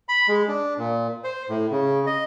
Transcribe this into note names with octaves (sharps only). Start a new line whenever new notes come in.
B5
G#3
D4
A#2
C5
A2
C#3
D#5